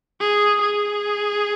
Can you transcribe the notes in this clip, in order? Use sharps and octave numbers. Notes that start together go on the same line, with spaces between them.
G#4
G#4